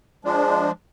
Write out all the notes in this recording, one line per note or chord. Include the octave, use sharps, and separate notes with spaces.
F3 G#3 D4